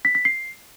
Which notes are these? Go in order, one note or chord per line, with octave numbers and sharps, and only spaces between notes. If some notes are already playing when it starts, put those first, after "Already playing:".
B6
B6
C7